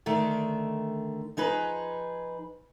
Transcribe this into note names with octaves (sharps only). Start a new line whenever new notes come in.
D3 D#3 A3
F3 D#4 G#4 B4